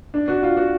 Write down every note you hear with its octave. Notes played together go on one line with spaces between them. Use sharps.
D4
F#4
F4
F#4